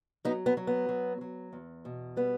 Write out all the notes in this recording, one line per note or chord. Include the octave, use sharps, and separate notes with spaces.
F#3 B3 D#4
B3
F#3
B3
F#3
F#3
E2
B2
G3 B3